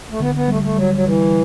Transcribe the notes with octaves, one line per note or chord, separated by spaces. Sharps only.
A3
D3 B3
B3
G3 A3
A3
F#3 G3
F#3
E3 G3